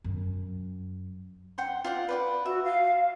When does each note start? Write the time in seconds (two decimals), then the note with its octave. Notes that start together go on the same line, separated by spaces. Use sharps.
0.04 F#2
1.58 F#5 G5 C6
1.84 F4 D5 F#5
2.09 B4 D5 F#5
2.45 F#4 E5
2.64 F5